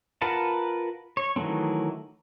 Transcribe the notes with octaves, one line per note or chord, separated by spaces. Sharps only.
F4 A#4 B4 F#5 A5
C#5
D#3 E3 F#3 A3 C4